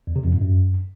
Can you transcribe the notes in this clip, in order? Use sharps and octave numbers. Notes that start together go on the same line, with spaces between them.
E2
C3
F2
G#2
F#2